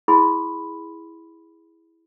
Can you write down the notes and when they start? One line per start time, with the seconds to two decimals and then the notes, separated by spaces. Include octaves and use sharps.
0.08 E4 G#4 B5 C6